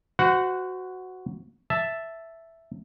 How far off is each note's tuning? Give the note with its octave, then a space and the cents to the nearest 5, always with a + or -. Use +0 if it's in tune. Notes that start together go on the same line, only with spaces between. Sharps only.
F#4 +0 C5 -35 F#5 +0
E5 +0 A5 +0